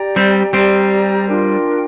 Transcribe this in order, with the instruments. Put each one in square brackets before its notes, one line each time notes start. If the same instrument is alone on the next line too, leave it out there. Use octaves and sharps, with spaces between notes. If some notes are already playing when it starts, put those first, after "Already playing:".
Already playing: [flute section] G4 D5 G5 A#5
[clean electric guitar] G3 C4
[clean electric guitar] G3 C4 [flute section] G4 D5 G5 A#5
[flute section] D4 F4 A#4 G5